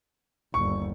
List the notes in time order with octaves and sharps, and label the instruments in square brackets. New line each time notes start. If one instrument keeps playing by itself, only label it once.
[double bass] G1 D#2 [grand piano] C#6